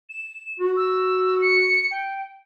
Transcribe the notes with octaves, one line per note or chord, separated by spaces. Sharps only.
E7
F#4
E6
C#7
G5